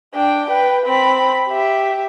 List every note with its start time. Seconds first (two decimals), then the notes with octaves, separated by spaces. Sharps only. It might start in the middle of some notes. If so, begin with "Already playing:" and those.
0.14 D4 G5
0.50 B4 G5
0.86 C4 B5
1.48 G4 E5